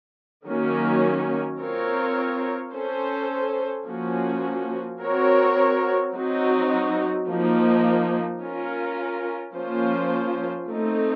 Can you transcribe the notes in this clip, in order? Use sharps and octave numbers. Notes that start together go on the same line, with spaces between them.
D#3 F#3 A#3 C#4
C4 F4 A#4 C#5
C#4 A4 C5
F3 A#3 C#4 F#4
C4 F#4 A#4 C#5
F#3 C4 D#4 F#4
F3 A#3 D#4
C#4 F4 A#4
F3 A#3 C#4 F4 C5
A3 C4 D#4